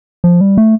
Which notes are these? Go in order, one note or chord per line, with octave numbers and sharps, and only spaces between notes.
F3
G3
A3